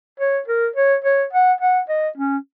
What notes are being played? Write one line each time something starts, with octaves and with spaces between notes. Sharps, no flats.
C#5
A#4
C#5
C#5
F#5
F#5
D#5
C#4